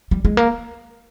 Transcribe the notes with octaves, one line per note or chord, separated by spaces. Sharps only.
G3
G#3
A#3